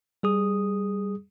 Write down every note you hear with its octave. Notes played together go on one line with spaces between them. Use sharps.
G3 G#4 D#6